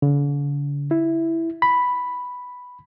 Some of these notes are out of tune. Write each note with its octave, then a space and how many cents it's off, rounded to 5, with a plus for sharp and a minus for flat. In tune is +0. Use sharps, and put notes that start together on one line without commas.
D3 -45
E4 +0
B5 +0